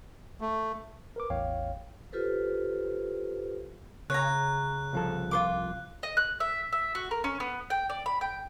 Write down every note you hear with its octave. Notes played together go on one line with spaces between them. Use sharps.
A3
A#4 B4 D6
A1 E2 C#5 F5 G5
F4 G4 A4 B4 C5
C#3 C#5 A#5 F#6
C2 F3 A4
F4 C5 D6
D#5
F#6
E5
E5
F#4
A#4
C#4
B3
G5
D5
B5
G5